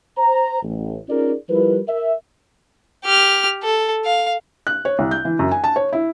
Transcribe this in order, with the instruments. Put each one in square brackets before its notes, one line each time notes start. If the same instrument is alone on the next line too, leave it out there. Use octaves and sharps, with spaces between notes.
[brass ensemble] C5 A#5
A1
C#4 D#4 F4 G#4 A#4 D5
F3 G3 E4 F4 A#4 B4
A#4 E5
[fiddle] G4 F6
A4
F5
[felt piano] F#6
C#5
C2
G6
E3
F#2
G#5
A5
C#5
E4